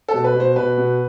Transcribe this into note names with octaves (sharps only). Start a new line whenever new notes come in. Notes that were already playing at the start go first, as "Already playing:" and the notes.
A4
B2
B4
B2
C5
B2 B4
B2